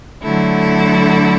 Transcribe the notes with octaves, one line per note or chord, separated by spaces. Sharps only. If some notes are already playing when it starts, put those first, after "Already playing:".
D3 F#3 A3 E4